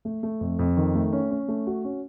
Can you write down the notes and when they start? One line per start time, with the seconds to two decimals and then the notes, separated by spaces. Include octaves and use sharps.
0.05 A3
0.23 A3
0.41 F2
0.59 F2
0.77 D#3
0.95 A3
1.12 C#4
1.31 C#4
1.48 A3
1.67 F#4
1.84 C#4